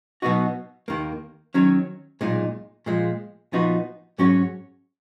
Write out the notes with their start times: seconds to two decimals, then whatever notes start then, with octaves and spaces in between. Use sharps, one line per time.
0.22 B2 F#3 B3 D#4 F#4
0.88 D#2 D#3 A#3
1.54 D#3 F#3 C#4
2.21 B1 A#2 G#3 D#4
2.86 A#2 F3 G#3
3.52 A#2 F3 B3 D#4 F#4
4.18 G#2 F#3 C#4 F#4 C#5